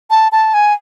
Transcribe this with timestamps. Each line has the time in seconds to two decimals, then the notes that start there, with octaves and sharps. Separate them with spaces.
0.10 A5
0.32 A5
0.54 G#5